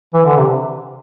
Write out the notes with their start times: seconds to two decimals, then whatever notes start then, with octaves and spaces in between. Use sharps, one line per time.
0.14 E3
0.26 D3
0.37 C3